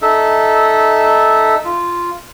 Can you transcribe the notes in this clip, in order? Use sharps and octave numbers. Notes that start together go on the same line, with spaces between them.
D#4 A4 E5
F4